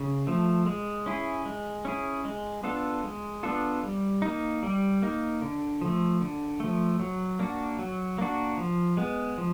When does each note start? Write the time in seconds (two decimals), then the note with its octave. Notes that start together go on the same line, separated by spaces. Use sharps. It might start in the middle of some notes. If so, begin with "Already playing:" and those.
Already playing: C#3
0.27 F3 A3
0.66 G#3
1.06 C#4 E4 G#4
1.46 G#3
1.85 C#4 E4 G#4
2.25 G#3
2.63 B3 D4 F4 A4
3.04 G#3
3.43 B3 D4 F4 A4
3.83 G3
4.22 A#3 D#4
4.63 G3
5.02 A#3 D#4
5.42 D3
5.81 F3 A3
6.21 D3
6.60 F3 A3
7.00 F#3
7.39 A#3 D4 F#4
7.79 F#3
8.18 A#3 D4 F#4
8.58 F3
8.97 G#3 B3
9.38 F3